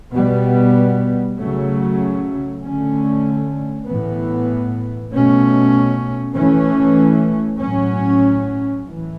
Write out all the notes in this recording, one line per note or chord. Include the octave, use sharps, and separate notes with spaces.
B2 G3 B3
C#3 F#3 A3 C#4
D3 A3 C#4
A2 E3 B3
B2 A3 C#4
E3 A3 C#4
A2 F#3 C#4
A2 E3